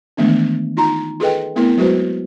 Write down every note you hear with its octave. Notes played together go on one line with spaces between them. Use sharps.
D#3 E3 G#3 A3 B3 D4
D#4 F4 A#5
F4 G#4 A4 B4 D#5 G5
A3 B3 C4 E4 A#4
F#3 G#3 F#4 B4 C5